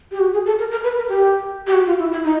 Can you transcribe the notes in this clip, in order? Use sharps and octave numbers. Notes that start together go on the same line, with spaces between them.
G4
F#4
G#4
A4
A#4
A#4
B4
A#4
G4
G4
F#4
F4
E4
E4
D#4